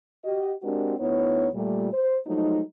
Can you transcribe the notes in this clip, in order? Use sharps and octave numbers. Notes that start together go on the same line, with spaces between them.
F#4 G4 D#5
G#3 C4 D4 F#4 G4 A#4
D2 B3 D#4 E4 C#5
A#2 G3 A3
C5
F3 F#3 G#3 A3 D#4